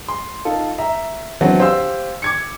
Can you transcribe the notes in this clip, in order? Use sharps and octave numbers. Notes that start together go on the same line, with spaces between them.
C6
D#4 F4 A4
E5 A#5
E3 F#3 B3 C4 D4 F#4
G4 C5 F5 C6 E6
D6 G#6 C#7